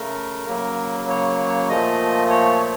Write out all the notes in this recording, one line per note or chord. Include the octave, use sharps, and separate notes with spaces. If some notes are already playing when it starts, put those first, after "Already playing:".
Already playing: C#3 A3 A#4
C#3 F#3 A#3
C#5
C#5
C#5
A#2 F3 A3 D#5
C#5
C#5